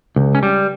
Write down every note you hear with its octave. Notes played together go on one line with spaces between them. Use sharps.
C#2
C#4
G3